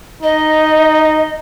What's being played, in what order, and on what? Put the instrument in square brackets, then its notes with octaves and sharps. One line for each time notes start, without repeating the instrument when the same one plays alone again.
[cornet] D#4 [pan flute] D#5